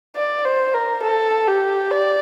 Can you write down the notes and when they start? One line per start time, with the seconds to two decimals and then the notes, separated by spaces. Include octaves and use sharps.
0.16 D5
0.45 C5
0.74 A#4
1.04 A4
1.47 G4
1.91 D5